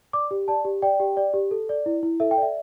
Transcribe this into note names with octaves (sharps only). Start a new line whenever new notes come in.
D5 D6
G4
D5 A5
G4
D5 G5
G4
D5
G4
A4
D5
E4
E4
A4 E5
G5
D5 E5